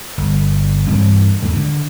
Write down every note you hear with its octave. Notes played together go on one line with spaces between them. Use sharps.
G1
G2 E3 C4
D#2 G#2
D3